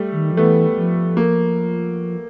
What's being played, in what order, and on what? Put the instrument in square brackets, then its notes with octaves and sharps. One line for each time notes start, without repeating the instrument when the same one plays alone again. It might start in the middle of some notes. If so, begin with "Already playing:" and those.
Already playing: [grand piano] G3 A3
[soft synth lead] D#3
F3
[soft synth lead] E3 [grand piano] A3 B3
[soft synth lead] F3
[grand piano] A#3